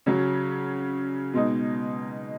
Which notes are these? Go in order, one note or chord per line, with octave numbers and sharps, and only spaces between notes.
C#3 F#3 C#4
B2 G#3 D#4